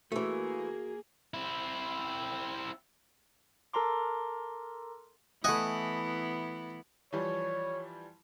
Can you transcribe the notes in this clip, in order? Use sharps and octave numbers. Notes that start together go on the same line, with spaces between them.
E3 A3 A#3 F#4 G#4
C4 E4
A4 A#4 A5 A#5 C6 D6
E3 A3 B3 E4 D#5 F#5 G#5
E3 F3 G3 C#5